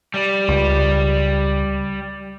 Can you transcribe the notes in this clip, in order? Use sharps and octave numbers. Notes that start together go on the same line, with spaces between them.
G3
C#2